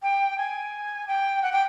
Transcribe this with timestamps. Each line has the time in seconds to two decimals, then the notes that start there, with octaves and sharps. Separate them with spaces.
0.02 G5
0.38 G#5
1.08 G5
1.42 F#5
1.52 G5